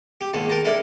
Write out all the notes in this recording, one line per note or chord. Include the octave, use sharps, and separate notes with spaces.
G4
D#2 G#2 A5
A#4 G5 A5 A#5
D4 E4 A4 A#4